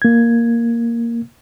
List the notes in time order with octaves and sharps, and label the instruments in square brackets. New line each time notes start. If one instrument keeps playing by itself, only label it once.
[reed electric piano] A#3 G#6